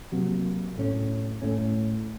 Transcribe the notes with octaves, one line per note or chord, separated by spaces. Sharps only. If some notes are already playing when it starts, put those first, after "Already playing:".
C3 F#3 A#3
A2 A3 C#4
A2 A3 C#4